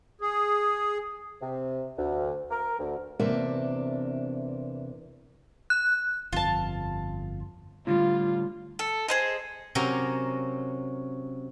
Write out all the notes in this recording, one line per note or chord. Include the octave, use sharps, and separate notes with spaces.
G#4
C3
D2
A#4
D2
E2 C3 A#3 D4 E5
F#6
G1 F2 F4 A5
A2 D3 G3 F4
A4
G#4 C5 D#5
C3 F#3 C#4 A#4 C6